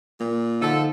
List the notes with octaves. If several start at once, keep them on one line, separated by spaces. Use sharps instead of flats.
A#2 A#3
D3 F3 D#4 A4